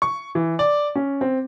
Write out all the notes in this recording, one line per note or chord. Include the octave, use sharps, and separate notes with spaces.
C#6
E3
D5
C#4
C4